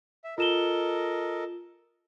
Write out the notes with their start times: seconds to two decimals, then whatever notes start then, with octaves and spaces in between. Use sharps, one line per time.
0.24 E5
0.38 F4 A4 A#4 D#5 E7 G7